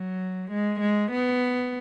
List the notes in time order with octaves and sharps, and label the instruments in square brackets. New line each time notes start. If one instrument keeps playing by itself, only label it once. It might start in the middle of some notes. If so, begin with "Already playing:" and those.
Already playing: [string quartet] F#3
G#3
G#3
B3